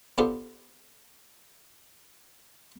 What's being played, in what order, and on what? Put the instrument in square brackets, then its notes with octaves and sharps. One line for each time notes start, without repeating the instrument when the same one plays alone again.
[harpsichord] B3 D4 F4 G4 A4 C5